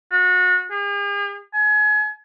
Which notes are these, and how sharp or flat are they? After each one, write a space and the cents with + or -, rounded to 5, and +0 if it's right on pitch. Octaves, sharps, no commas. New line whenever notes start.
F#4 -30
G#4 -45
G#5 +30